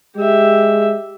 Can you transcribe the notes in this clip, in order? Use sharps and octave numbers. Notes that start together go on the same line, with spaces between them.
G#3 G4 E5